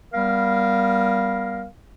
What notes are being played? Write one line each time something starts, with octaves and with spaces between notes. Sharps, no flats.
G3 B3 A#4 F5